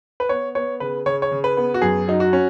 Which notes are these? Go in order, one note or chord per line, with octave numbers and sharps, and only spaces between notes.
B4
B3 C#5
B3 C#5
C#3 B4
C#3 C#5
C#5
C#3
B4
B3
F#4
F#2 G#4
F#3 D#4
F#4
C#4